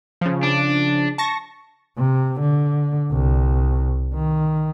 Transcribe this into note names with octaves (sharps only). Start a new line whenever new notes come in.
C#3 F3
D4
A5 C#6 A#6
C3
D3
C2
D#3